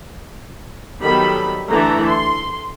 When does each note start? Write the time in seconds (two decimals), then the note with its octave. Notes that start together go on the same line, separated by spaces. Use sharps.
1.00 D#3 F#3 G3 B3 A4 B5
1.70 D3 E3 A3 E4 A4 A#5
2.07 C6